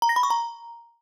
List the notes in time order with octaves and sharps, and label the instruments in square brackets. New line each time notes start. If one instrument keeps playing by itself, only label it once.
[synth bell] A#5
A#6
B5
C#6
A#5